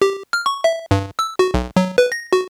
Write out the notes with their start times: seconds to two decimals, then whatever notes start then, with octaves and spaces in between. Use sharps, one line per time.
0.02 G4
0.33 F6
0.46 C#6
0.64 E5
0.91 G2
1.19 E6
1.39 F#4
1.54 B1
1.76 F#3
1.98 B4
2.12 A#6
2.33 F#4